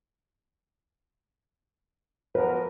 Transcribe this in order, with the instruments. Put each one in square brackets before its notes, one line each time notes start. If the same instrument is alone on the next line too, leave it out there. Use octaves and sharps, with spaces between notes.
[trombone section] B2 F3 A#4 [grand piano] B4